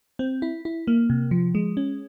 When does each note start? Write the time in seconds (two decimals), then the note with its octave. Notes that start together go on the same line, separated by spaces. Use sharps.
0.19 C4
0.42 E4
0.65 E4
0.87 A#3
1.10 C3
1.31 F3
1.55 G#3
1.77 C#4